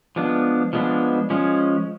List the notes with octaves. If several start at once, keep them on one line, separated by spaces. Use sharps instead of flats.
F3 G#3 B3 D4
F3 G#3 B3 D4
F3 G#3 C#4